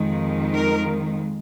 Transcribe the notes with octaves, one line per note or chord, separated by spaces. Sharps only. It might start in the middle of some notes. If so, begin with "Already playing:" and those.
Already playing: F2 D#3 G#3
A#4